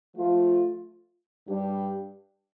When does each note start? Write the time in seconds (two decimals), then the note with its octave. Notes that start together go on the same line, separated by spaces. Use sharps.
0.16 F3 A3 F4
1.48 G2 G3 D4 G4